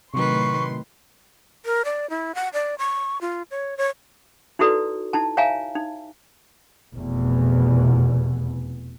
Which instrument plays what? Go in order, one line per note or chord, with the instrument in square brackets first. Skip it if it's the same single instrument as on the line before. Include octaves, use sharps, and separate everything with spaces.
[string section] A2 C6 [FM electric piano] C3 F#3 [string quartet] D#3 B4 [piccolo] C#6
[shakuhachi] A#4
D5
E4
F#5
D5
C#6
F4
C#5
C#5
[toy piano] D#4 E4 F#4 A4 B4 D5
D#4 E4 A5
C#5 E5 F5 G#5 A#5
D#4
[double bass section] F1 E2 B2